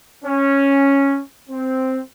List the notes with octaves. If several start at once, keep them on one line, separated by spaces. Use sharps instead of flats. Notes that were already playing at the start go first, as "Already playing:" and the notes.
C#4
C4